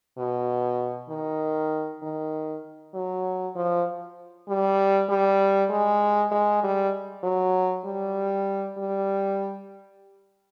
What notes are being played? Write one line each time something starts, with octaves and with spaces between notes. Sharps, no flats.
B2
D#3
D#3
F#3
F3
G3
G3
G#3
G#3
G3
F#3
G3
G3